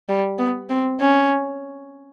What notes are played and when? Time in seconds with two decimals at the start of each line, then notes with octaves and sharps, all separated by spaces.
0.09 G3
0.39 B3
0.70 C4
1.00 C#4